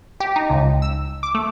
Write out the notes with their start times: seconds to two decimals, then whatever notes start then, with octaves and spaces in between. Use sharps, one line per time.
0.20 G4
0.36 D#4
0.50 C#2
0.82 E6
1.23 D6
1.35 A3